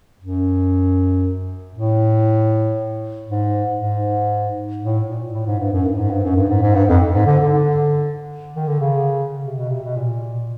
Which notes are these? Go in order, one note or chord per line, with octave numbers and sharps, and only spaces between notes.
F#2
A2
G#2
G#2
A2
A#2
A2
G#2
G2
F#2
G2
A2
G#2
G2
F#2
G2
G#2
G#2
G2
F2
G#2
D3
D3
D#3
D3
C#3
C3
B2
C3
B2
A#2